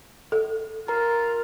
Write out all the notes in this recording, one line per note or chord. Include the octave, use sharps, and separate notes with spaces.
A4
F4 A#4 A#5